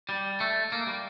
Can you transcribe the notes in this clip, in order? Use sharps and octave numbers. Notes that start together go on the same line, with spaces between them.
G3
A3
A#3
G3